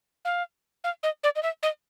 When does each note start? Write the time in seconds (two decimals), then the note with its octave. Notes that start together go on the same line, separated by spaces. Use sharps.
0.25 F5
0.84 F5
1.03 D#5
1.23 D5
1.36 D#5
1.43 E5
1.63 D#5